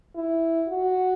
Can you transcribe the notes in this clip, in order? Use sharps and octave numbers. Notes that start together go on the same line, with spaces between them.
E4
F#4